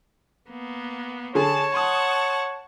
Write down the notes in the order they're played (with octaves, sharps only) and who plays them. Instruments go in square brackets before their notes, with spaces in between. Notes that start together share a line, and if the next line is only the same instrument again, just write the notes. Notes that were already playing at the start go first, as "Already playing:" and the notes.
[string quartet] A#3 B3
[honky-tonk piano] D3 G#4 [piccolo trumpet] C#5 [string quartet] A5
[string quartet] F#5 A5 C#6 [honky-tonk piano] C6 D#6